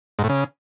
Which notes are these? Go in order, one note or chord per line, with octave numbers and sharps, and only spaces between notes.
G#2
A2
C#3